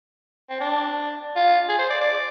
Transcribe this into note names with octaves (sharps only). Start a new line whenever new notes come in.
C4
D4
F4
G#4
C5
D5
D5